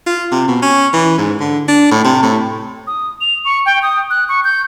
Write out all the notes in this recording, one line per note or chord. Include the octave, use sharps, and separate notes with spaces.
F4
C3
B2
C#4
E3
G#2
D3
D4
A2
C3
A2
D#6
F7
C#6
G5
D#6
F#6
C#6
G6